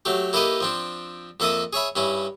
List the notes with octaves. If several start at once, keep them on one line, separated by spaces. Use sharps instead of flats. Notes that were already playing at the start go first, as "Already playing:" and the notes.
F#3 A3 G4
A#3 E4 G4 A4 B4 D#5
F3 C4 D4
F2 A#3 A4 E5 A5 D#6
G#4 C#5 E5 B5
G2 C#4 E4